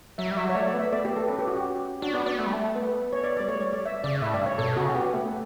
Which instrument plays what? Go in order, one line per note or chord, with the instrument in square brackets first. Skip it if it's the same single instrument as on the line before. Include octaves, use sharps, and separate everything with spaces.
[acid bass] F#3 [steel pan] E5
[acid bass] G3
[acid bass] F#3 [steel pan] E5
[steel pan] C#5
[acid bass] A3 [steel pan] D5
[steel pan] D5
[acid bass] B3
[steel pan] E5
[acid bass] A3 [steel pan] D5
[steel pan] G4
[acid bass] B3
[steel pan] A4
[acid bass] C#4 [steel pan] B4
[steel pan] G4
F#4
G4
[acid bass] D4 [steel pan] F#4
[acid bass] B3 [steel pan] D5
[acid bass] B3 [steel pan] D5
[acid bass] A3
G3
A3
B3
[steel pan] C#5
D5
[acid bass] G3 [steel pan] D5
[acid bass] A3 [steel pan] C#5
[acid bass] G3 [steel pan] C#5
[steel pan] D5
E5
[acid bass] C#3 [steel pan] D5
[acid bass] A2 [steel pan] E5
[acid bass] G2 [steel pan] D5
[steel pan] C#5
[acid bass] B2 [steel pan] A4
[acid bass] C#3 [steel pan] F#4
[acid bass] C#4
[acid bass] B3 [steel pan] G4
[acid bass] A3